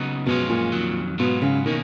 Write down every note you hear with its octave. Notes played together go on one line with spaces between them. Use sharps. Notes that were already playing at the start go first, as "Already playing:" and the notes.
Already playing: C#3 F#3 B3 D#4
F#2 B2 F3 G#3 C#4 F4
A#2
F2 D#3 F#3
G#2 B2 F#3 B3 F4
C#3
B2 D#3 A#3 C#4